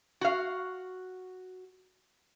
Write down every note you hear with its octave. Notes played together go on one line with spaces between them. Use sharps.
F#4 F5